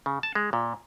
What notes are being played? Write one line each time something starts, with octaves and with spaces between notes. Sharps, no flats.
C#3
A5
G#3
A#2